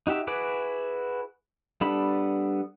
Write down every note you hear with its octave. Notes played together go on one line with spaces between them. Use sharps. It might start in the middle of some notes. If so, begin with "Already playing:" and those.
D#4 F#4 G4 E5
E4 F#4 G#4 B4 D6
G3 B3 D4 A4 B5